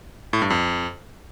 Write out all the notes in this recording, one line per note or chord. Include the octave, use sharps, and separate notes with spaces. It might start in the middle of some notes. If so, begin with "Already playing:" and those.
A2
G2
F2